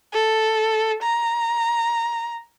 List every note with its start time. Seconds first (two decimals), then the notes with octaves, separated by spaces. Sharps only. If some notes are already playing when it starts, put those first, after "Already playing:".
0.13 A4
1.02 A#5